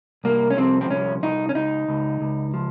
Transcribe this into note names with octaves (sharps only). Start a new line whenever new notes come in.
C2 A#3
C#4
F3 C4
C4
C2 C#4
C2 D#4
C#4
C#2 D#4
C#2
C#2
F3